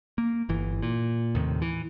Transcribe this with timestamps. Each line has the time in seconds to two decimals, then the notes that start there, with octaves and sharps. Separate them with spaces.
0.18 A#3
0.49 G1 E3
0.82 A#2
1.35 D#2 A2 C3
1.62 E3